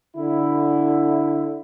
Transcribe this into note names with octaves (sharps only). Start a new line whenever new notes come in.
D3 E4